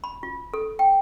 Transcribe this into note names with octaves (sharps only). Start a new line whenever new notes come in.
B5
F4
A4
G5